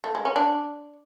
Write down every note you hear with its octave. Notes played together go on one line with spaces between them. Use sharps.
A3
G#3
C#4
D4